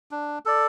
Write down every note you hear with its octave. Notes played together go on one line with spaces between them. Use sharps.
D4
A4 D5